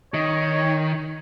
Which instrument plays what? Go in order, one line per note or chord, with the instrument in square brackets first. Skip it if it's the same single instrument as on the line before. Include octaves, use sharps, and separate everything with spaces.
[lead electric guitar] D#3 [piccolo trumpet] C#5